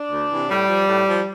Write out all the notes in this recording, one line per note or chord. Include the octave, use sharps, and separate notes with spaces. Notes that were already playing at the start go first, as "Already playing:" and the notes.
Already playing: D4
D2
C3 E3
A2 G3
F3
A2
F3